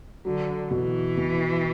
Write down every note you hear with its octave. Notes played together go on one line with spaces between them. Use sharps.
D3 F#3
B2 E3
B2